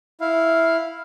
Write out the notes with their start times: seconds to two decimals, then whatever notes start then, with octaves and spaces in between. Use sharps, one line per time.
0.21 E4 F5